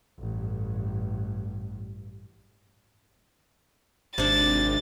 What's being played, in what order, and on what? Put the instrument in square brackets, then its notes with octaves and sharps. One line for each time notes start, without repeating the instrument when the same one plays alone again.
[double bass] A1 G2
[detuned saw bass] G#1 [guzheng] C3 D4 [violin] A6